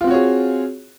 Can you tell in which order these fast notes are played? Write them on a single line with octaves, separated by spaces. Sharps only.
F4 C4 F#4 C#5 G#4